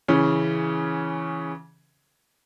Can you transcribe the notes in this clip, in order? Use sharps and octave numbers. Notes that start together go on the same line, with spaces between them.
C#3 E3 C#4